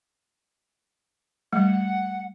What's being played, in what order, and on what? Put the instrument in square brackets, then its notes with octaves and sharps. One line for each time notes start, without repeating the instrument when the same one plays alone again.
[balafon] G3 A3 [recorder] F#5